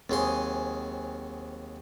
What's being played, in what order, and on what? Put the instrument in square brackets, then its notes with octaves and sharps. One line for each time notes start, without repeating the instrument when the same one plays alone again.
[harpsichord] D#2 F#3 C6 [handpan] C4 G#4